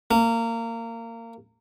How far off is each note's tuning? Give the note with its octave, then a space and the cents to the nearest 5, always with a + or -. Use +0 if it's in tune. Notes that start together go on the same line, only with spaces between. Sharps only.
A#3 -25